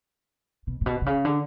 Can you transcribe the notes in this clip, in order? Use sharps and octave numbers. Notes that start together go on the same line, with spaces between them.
B2
A#2
B2
C3
C#3
D3